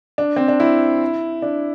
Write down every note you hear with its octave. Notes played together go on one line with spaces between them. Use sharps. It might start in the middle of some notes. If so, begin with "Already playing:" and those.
D4
C4
D4
E4
D4